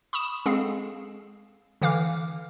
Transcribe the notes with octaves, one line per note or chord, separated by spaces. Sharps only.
B5 C#6 D#6 E7
G#3 C4 G#4 A4 F5
D3 E3 F5 D6 F6